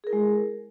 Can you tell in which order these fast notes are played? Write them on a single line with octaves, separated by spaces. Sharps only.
G#4 A#4 E4 G#3